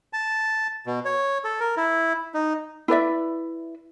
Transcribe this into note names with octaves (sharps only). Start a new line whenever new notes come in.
A5
B2
C#5
A4
A#4
E4
D#4
E4 B4 D5 E5